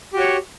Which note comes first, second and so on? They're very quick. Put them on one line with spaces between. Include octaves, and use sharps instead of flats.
G4 F#4 C#5